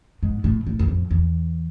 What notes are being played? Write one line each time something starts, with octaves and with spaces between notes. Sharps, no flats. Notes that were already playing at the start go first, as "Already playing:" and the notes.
G#2
A2
A2
E2
F2
E2